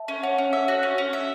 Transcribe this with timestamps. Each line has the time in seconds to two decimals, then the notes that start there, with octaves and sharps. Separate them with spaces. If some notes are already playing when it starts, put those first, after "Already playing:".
Already playing: E5 A5
0.08 C#4
0.23 C#4 C#5 F#5
0.38 C#4
0.53 E5
0.68 F#4 C#5
0.83 C#4
0.98 C#4
1.13 E5